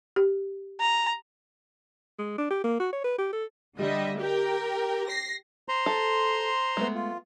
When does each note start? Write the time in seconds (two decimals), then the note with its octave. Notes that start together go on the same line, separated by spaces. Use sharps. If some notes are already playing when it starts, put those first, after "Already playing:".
0.16 G4
0.80 A#5
2.19 G#3
2.39 D4
2.51 G4
2.64 A#3
2.80 F#4
2.93 C#5
3.04 B4
3.19 G4
3.33 A4
3.77 D3 G3 D#5 E5
4.19 G4 A#4 G5
5.07 A#6 C7
5.69 C5 A#5 C6
5.86 A4
6.77 G#3 A3 B3
6.95 F4